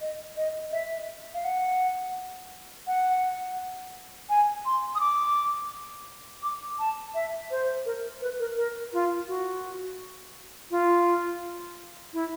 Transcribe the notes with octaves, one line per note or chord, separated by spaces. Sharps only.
D#5
D#5
E5
F5
F#5
F#5
G#5
C6
D#6
D6
D6
A5
E5
C5
A#4
B4
A#4
A#4
F4
F#4
F4
E4